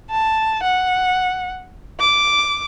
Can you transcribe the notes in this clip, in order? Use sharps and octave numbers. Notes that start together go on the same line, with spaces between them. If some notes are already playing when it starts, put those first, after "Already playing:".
A5
F#5
D6